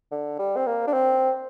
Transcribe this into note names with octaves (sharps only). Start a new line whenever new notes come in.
D3
G3
C4
A#3
D4
C4